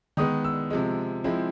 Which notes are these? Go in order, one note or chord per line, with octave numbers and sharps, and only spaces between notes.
D#3 G#3 B3 D#6
E6
C3 F3 G#3
F3 G#3 C4 E4